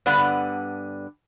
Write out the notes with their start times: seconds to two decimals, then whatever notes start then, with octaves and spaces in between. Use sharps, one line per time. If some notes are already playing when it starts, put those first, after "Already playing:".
0.06 G2 D3 B3 D5 F#5